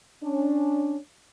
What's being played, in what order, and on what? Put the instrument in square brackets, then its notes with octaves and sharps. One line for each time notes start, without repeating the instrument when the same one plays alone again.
[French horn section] C#4 D4